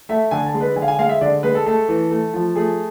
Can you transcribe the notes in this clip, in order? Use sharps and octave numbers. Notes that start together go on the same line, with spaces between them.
A3 E5
D3 G#5
A5
G#3
B4
D3 G#5
F5
G#5
G#3 F5
E5
D3 D5
G#3 B4
A4
A3 A4
E3
A3
F3
A3 G#4